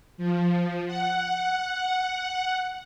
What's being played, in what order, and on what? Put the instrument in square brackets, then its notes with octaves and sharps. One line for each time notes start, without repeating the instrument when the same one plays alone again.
[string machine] F3
F#5